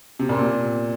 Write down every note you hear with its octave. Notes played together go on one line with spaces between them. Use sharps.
C3
A#2
C3